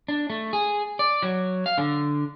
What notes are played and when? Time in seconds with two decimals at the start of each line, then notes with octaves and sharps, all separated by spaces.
0.08 D4
0.30 A3
0.53 G#4
0.99 D5
1.23 F#3
1.66 F5
1.78 D3